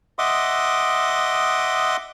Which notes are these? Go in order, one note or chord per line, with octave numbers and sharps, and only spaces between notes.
D#5 E5 F#5 C6 D6 D#6